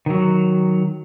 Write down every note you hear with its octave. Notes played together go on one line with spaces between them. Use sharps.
D#3 F#3